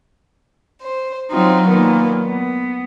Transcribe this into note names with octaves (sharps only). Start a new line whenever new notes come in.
C5
F#3 C4 D#4 F4
A#2 D#3 F#3 B3
B3